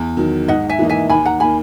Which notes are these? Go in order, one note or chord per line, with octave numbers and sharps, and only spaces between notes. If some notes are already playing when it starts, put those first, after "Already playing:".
Already playing: E2
D#3 F#3
G#2 D#5 F#5
E5 G#5
E3 A#3 D#4
E5 G#5
D#2 G#5 B5
F#5 A#5
D#3 A#3 G#5 B5